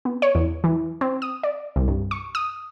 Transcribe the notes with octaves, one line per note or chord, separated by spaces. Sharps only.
B3
C#5
E2
E3
C4
D#6
D5
C2
G2
C#6
D#6